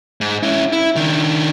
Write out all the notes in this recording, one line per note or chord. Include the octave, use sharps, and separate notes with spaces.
G#2
C#4 E4
E4
D#3 D4